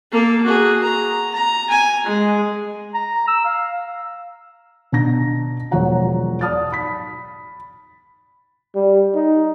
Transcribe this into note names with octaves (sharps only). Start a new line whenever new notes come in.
A#3 A4
F#4 G#4
A#5
A#5
G#5
G#3
A#5
E6
F5
B2 D4 A5 A#5 A#6
E1 F3 F#3 C#5 F#5 A#5
D5 A5 D#6 F6 A6
B5 B6
G3
D#4